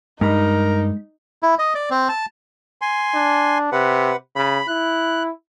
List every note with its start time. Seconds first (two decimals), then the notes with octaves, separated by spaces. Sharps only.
0.21 G2 G#3 D#4 A#4 B5
1.43 E4
1.59 D#5
1.75 D5
1.90 C4
2.09 A5
2.82 G#5 C6
3.15 D4
3.72 C3 B4 F#5
4.36 C#3 B5
4.68 E4 F#6